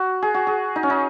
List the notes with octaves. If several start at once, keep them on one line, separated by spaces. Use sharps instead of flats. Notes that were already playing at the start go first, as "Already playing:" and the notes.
Already playing: F#4
G#4
F#4
G#4
D#4
C#4
D#4